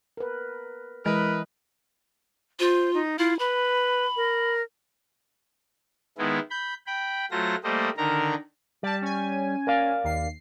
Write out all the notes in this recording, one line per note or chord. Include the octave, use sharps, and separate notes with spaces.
A#4 B4
E3 G#3 E4 A#4 B4 D#5
F4 C5
D#4
E4 F4
B4 B5
A#4
D#3 G#3 B3 E4
B5 G6
G5 B5
F#3 A3 F4 C5 A#6
G3 A3 A#3 C5 D#5
D3 D#3 A#4 A#5
G3 D5 A5
C#4 G#5
A#4 D5 F5
D#2 C7